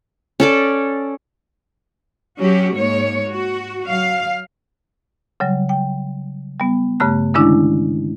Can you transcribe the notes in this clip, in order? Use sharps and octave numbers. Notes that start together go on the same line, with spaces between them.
C#4 A4 D5
F#3 C#4 F#4 G4
G#2 A#3 C#5
F#4
F#3 F5
C#3 F#3 G3
G5
G3 B3
G2 C#3 A3 F#6
D3 D#3 G#3 C#4 D4 E4